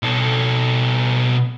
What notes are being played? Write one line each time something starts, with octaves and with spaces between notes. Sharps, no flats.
B2 A4